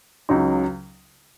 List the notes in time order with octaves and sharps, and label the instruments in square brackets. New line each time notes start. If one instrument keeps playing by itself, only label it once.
[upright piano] C#2 C#3 F#3 D#4